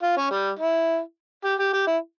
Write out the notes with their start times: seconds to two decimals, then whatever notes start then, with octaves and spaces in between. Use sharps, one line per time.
0.02 F4
0.17 C#4
0.31 G3
0.59 E4
1.44 G4
1.59 G4
1.73 G4
1.87 E4